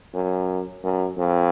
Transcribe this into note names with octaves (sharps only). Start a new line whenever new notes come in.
F#2
F#2
F2